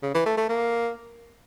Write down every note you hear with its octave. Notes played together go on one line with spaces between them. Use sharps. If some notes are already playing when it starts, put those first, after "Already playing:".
C#3
E3
A3
A3
A#3